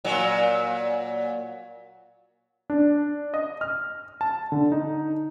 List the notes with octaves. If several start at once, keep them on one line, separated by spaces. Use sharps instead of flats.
A#2 F#3
D4
D#5
F6
A5
D3
D#4